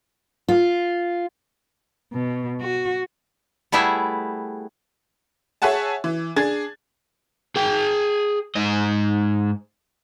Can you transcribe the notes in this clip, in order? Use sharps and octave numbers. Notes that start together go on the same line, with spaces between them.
F4
B2
F#4
G3 A3 B3 E4 G#4 E5
G#4 C#5 E5 F#5 G#5 A5
E3
D4 G#4 G#6 A6
G#4 G5
G#2 D#5